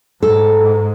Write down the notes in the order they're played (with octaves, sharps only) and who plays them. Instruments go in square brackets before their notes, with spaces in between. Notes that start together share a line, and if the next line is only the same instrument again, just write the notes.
[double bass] G#2 [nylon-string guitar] A4